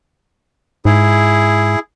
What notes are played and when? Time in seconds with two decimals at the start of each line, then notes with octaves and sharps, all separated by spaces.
0.85 G#2 E4 G#4